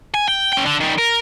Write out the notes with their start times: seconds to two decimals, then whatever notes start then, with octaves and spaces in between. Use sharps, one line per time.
0.14 G#5
0.28 G5
0.53 C#4 G5
0.66 D3
0.80 D#3 G3
0.98 A#4